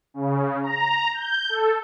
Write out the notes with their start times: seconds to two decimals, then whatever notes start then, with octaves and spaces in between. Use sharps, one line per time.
0.14 C#3
0.62 A#5
1.14 G6
1.49 A4